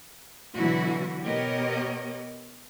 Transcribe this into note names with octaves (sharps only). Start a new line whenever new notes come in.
B2 D3 E3 F#3 E4 F#4
B2 B3 G4 A#4 C#5 D#5